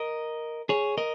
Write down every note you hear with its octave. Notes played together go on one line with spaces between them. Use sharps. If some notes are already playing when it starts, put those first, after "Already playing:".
Already playing: A#4 D#5
G#4 C#5
A#4 D#5